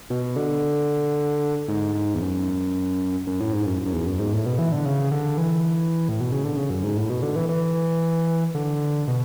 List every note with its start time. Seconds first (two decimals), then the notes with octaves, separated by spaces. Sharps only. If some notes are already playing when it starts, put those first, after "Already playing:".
0.10 B2
0.36 D3
1.68 G#2
1.95 G#2
2.15 E2
2.21 F#2
3.27 F#2
3.40 A2
3.53 G#2
3.66 F#2
3.86 F#2
3.93 E2
4.06 F#2
4.19 G#2
4.33 A2
4.46 B2
4.58 E3
4.72 D3
4.85 C#3
5.12 D3
5.37 E3
6.09 A2
6.20 B2
6.32 C#3
6.44 D3
6.56 C#3
6.70 F#2
6.84 G#2
6.97 A2
7.10 B2
7.22 D3
7.36 E3
7.49 E3
8.55 D3
9.08 B2